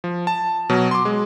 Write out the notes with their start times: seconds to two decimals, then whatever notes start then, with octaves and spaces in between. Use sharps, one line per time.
0.04 F3
0.27 A5
0.69 B2 F#3
0.91 C6 D6
1.05 G#3